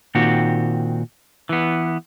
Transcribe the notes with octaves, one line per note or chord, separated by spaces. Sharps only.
A#2 D#3 C4 F#4 G4
E3 B3